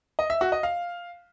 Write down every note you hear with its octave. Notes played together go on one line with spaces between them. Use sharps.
D#5
E5
F#4
D#5
F5